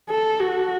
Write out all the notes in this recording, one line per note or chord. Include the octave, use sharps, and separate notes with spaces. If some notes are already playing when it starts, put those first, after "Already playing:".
A4
F#4